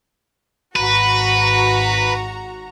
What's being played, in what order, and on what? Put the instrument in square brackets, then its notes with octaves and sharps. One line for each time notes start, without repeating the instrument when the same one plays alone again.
[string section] G#1 F#4 A#5 [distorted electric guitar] B4